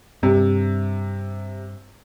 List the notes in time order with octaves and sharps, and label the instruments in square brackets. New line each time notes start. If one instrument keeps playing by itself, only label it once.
[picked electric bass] G2 [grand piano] C3